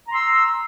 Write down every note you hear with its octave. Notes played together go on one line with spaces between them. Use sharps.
A#5 C6 E6